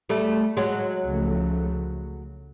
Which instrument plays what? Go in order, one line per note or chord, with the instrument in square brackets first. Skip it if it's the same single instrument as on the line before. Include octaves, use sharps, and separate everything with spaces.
[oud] G3 A3
F#3 G#3
[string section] C#2 C#3 F3 A3